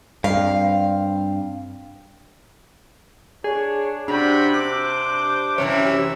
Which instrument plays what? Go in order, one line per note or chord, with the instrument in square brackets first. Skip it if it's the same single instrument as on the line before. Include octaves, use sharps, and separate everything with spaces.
[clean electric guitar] G2 [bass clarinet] C4 [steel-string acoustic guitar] F5
[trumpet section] D4 C#5 [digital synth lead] G#4
[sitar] C3 [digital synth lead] D4 [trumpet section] F#4 G5 B5
[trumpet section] D4 C5 D6 [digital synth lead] F#6
[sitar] F#2 C3 E3 [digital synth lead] C#5 [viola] E5